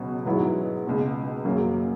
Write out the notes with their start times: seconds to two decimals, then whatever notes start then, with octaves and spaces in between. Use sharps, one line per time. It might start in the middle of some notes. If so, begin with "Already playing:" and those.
Already playing: C#2 B2 F#3 C#4
0.25 G#2 F#3 B3 E4
0.86 C#2 B2 G#3
1.45 F#2 C#3 F#3 A#3